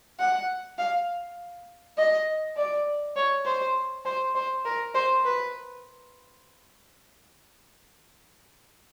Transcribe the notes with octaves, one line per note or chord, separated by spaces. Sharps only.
F#5
F5
D#5
D5
C#5
C5
C5
C5
A#4
C5
B4